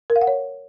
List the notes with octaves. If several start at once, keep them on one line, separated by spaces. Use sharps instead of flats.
A#4
F5
F#5
C#5